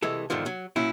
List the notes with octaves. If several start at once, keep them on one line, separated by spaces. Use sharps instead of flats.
C2 E3 G#3 A4
E2 G#2 D3 D#3 F3
F#3
A#2 F#3 C#4 E4